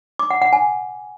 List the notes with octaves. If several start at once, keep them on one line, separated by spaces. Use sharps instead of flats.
D6
F#5
F#5
G#5